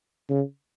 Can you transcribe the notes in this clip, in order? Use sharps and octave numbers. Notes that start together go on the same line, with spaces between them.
C#3